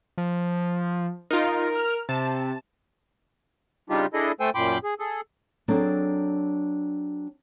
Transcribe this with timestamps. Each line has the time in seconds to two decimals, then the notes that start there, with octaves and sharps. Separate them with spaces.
0.18 F3
1.31 D#4 F4 A#4
1.75 F6
2.09 C3 A5
3.90 C#3 G3 D4 D#4 F4 G4
4.14 D4 E4 G#4 A4 D#5
4.40 A3 A4 C5 G5 G#5
4.55 F#2 A#2 G5 B5 C6 D6
4.84 G#4
4.99 G#4 A4
5.68 F#3 C4 D4 G#4 A4